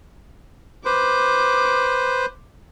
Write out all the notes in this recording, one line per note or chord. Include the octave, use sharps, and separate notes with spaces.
B4 C5 D6